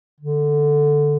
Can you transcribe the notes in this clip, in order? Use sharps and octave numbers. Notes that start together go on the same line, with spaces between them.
D3